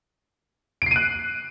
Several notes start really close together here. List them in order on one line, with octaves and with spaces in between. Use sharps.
D7 C7 D#7 F#6